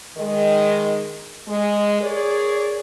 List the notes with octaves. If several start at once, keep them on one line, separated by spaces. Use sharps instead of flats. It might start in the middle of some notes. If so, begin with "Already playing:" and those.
D#3 G#3
G#3
G#4 A#4 C#5 D5